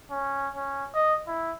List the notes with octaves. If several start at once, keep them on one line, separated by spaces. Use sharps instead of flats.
C#4
C#4
D#5
E4